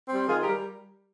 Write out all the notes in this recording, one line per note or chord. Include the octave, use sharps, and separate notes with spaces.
G3 C4
D#3 F4 G#4
G4 A#4
G3